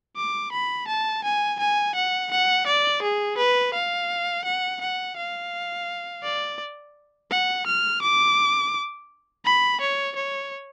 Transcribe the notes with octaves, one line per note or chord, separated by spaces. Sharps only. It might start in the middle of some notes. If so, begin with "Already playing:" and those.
D6
B5
A5
G#5
G#5
F#5
F#5
D5
G#4
B4
F5
F#5
F#5
F5
D5
F#5
F6
D6
B5
C#5
C#5